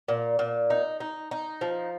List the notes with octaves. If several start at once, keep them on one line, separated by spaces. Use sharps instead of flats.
A#2
A#2
D#4
D#4
D#4
F3